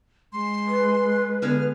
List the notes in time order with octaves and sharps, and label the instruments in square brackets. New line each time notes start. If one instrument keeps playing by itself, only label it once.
[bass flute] G#3 [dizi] C6
[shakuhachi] B4
[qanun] D3 B3 G#4 [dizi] F6